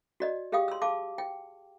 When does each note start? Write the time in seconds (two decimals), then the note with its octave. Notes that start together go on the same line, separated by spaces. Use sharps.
0.20 F#4 D5 D#5
0.52 G4 G#4 F5 G5 D#6
0.68 C6 E6
0.82 G#4 F5 A5 D6
1.18 G5